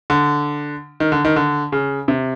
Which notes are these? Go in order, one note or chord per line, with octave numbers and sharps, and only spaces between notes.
D3
D#3
D3
D#3
D3
C#3
C3